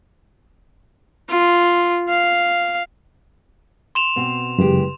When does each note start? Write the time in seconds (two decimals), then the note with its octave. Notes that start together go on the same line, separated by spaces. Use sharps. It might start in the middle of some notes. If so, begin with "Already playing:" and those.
1.29 F4
2.09 F5
3.95 C6 E7 F7
4.16 B2 C4
4.58 F#2 C#3 E3 G#3 G4